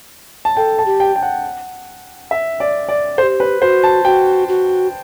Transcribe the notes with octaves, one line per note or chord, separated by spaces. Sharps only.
A5
A4 G5
A5
G4
G5
G5
F#5
E5
D5
D5
A4 C5
G4
B4
F#4 C5
A5
F#4 G5
F#4